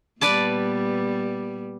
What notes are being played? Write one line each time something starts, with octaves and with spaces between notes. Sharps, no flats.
A#2 G3 B3 B4 D5 A5